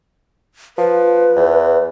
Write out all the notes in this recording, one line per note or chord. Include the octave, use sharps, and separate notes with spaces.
F3 B4
E2